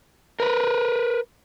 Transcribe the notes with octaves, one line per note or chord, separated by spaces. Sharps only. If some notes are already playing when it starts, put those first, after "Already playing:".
A#4 B4